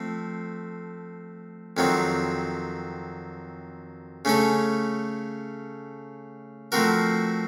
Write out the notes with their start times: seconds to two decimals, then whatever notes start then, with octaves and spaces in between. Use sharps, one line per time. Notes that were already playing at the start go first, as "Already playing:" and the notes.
Already playing: F3 A3 C4
1.77 F2 D#3 F#3 C4
4.25 C#3 A3 C#4 A4
6.72 F3 A3 C4 F#4 A#4